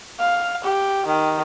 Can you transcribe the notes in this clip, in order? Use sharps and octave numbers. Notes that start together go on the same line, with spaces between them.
F5
G4
D#3